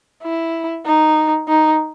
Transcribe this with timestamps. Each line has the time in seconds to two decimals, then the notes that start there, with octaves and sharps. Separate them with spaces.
0.23 E4
0.85 D#4
1.48 D#4